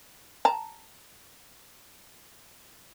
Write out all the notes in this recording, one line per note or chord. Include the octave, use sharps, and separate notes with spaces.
A5 A#5